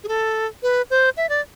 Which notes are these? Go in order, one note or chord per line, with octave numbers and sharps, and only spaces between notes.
G#4
A4
B4
C5
E5
D5